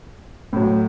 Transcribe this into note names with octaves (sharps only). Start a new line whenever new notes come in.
A2 F#3